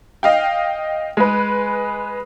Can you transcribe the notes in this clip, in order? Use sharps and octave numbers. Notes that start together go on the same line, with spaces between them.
D#5 F5 G5
G#3 B4